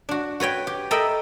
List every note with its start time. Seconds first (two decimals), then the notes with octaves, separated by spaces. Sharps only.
0.09 D4 F#4
0.40 F#4 B4 C#5 G5
0.67 G4
0.91 A4 A#4 D#5 E5 G5 B5